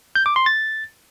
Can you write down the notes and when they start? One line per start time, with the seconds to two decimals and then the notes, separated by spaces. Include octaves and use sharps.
0.15 G6
0.26 D6
0.36 C6
0.46 A6